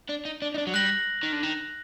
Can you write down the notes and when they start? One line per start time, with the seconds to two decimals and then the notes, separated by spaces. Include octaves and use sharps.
0.09 D4
0.25 D#4
0.42 D4
0.54 D#4
0.58 D4
0.67 F#3
0.74 G3 F#6 A#6 F#7
1.23 D#3
1.32 D3
1.43 D#3